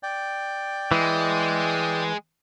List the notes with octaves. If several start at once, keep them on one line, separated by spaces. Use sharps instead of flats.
D5 G5
E3 G#3